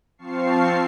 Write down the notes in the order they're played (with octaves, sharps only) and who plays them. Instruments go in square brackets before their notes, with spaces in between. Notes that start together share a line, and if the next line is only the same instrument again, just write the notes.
[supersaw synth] F3 C4 F5 A5 C#6 C7